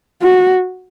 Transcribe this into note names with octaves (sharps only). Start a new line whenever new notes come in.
F#4